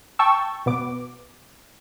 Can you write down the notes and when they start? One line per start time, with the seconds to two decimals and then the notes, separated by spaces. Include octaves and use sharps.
0.19 G5 A5 C#6 E6
0.66 B2 B3 D6